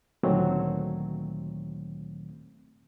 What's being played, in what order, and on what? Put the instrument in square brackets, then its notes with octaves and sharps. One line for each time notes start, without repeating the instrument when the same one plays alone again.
[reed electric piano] D2 A#2 D#3 F#3 A3 C4